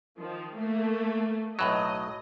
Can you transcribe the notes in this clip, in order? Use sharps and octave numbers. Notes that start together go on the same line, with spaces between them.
D#3 F3
A3 A#3
B1 A2 F#3 D#5